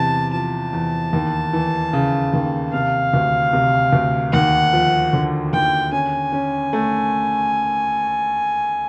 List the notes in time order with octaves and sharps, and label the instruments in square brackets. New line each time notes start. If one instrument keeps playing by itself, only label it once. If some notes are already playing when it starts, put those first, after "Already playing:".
Already playing: [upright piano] E2 C3 [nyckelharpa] A5
[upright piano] F3 [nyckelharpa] A5
[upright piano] E2
D#2
E3
C#3
D#2
[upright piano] C3 [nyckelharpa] F5
[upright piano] D2
C3
D2
[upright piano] D#2 [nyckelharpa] F#5
[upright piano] F3
D3
[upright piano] D#2 [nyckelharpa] G5
[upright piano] C#4 [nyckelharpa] G#5
[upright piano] C#4
A3